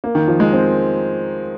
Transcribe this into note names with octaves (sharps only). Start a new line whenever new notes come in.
A#3
D#3
F3
G#3
C4